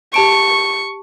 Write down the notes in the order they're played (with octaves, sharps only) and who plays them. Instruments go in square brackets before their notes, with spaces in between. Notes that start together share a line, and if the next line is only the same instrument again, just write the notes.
[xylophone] G4 A5 D7 [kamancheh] C#6